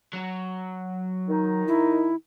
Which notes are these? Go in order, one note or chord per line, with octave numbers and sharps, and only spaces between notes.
F#3
D#3 D#4
E4